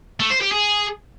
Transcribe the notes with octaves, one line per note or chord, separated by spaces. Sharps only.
A3
C5
G4
G#4